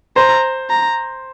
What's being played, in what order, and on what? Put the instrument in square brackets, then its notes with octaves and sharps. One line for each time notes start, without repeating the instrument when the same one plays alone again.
[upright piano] C5 [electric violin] A#5
[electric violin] A#5